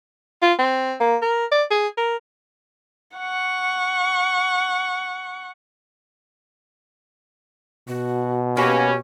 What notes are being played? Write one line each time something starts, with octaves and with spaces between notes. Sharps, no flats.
F4
C4
A#3
A#4
D5
G#4
A#4
F#5 C#6
B2 F#4
A#3 C#4 F#4 G4 B4